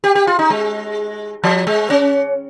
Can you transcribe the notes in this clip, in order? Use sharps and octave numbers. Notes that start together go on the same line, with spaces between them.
G4
G4
F4
D#4
G#3
F3
G#3
C#4